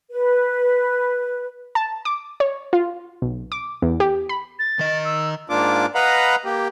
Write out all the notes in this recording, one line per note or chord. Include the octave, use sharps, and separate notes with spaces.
B4
A5
D6
C#5
F4
B1
D6
E2
G4
B5
A6
D#3 D#5
E6
G#2 A#3 D4 F4 D6
B4 D#5 F5 F#5 A#5 B5
A#3 G4